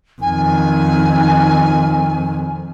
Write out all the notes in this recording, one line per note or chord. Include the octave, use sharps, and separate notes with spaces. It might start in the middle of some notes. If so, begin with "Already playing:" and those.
F2 D#3 G#5